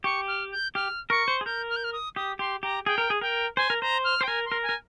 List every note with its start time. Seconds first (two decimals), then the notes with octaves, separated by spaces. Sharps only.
0.04 G4 C#6
0.28 F6
0.52 G6
0.75 G4 F6
1.10 A#4 C#6
1.28 C5
1.41 G#4
1.45 A#4 G6
1.69 F6
1.76 G6
1.84 F6
1.93 D#6
2.16 G4 D#6
2.39 G4 C6
2.63 G4 A#5
2.86 G#4 G5
2.98 A#4
3.10 G#4
3.21 A#4 G5
3.57 C5 G#5
3.70 A#4
3.81 C5 A#5
4.04 F6
4.21 C5 G5
4.28 A#4 G#5
4.45 C6
4.52 A#4
4.63 G#5
4.69 A#4